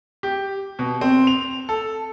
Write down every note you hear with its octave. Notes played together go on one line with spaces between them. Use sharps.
G4
B2
C4
F7
A4